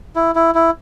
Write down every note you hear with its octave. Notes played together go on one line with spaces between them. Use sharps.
E4
E4
E4